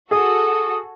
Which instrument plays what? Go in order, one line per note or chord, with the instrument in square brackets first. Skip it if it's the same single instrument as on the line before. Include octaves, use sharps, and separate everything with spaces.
[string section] F#4 A4 [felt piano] G#4 [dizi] D#6